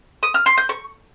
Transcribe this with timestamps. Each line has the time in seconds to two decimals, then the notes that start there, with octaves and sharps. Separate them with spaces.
0.23 D#6
0.34 F6
0.46 C6
0.58 G6
0.69 C#6